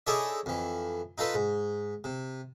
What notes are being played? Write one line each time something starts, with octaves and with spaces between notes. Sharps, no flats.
D#4 E4 G#4 A4 C#5 D5
F2 E3
D#4 F4 A4 B4
G#2
C3